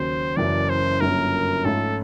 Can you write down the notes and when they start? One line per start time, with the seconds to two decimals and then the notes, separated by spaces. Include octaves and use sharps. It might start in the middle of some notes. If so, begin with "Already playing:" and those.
Already playing: D#2 C#3 F#3 C5
0.37 F#1 F#2 C#3 E3 D5
0.70 C5
1.01 G1 F#2 C#3 F#3 A#3 A#4
1.65 G#2 F3 A3 C#4 F4 A4